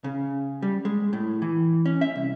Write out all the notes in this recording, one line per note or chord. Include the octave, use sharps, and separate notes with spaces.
C#3
G3
G#3
A2
E3
C#4
E5
C2